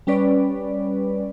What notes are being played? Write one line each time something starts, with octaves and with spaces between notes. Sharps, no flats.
G3 C#4 B4 D5